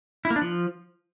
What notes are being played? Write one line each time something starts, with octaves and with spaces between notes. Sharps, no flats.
E4
A#3
D4
F3